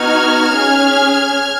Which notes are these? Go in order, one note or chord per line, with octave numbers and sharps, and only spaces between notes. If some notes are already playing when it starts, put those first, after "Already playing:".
Already playing: B3 D#4 F#4 F6 G#6
C#4 G#4